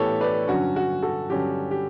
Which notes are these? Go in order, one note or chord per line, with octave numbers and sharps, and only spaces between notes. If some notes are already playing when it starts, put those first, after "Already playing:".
Already playing: A2 E3 B3 E4 G4 A4 C#5
B4 D5
G2 D3 F#3 C#4 F#4
F#4
F#4 A4
G2 D3 F#3 C#4 G4
G4